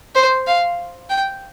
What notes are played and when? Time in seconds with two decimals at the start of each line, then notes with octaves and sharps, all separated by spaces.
0.15 C5
0.47 F5
1.10 G5